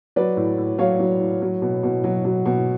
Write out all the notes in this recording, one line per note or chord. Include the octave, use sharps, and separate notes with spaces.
F#3 B4 D5
A2
A2
F#3 C#5 F5
F#3
A2
F#3
B2
B2
F#3
F#3
B2